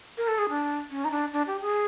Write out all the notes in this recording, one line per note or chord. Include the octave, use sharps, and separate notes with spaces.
A#4
A4
G#4
D4
C#4
D#4
D4
D4
G4
G#4